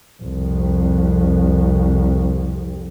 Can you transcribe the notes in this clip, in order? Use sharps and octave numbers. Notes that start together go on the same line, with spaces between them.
C2 F2